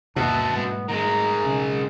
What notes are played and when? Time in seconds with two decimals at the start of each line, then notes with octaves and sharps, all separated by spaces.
0.16 G1 D#2 B2 F#4 E5 A5
0.56 G#2 G3 A3 B3
0.89 D#3 G#3 A#5
1.44 B1 C#3